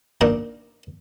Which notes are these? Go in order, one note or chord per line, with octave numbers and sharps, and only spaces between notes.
A#2 D4 D#4 D#5